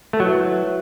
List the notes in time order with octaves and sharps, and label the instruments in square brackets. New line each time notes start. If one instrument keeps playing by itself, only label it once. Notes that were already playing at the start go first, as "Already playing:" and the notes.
[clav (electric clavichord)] A3
[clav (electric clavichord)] F#3 [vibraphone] E4 B4 E5